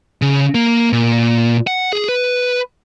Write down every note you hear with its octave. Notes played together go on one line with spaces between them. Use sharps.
C#3
A#3
A#2
F#5
G#4
B4